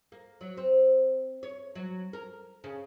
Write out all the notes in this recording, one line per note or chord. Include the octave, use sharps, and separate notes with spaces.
A#3
F#3
C4
C#5
F#3
A#4
C#3